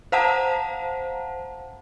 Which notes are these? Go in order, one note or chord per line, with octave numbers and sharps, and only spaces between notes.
C5 F5 F#5 A5 A#5